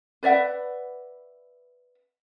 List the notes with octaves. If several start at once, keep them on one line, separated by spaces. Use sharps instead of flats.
B4 D5 E5 F#5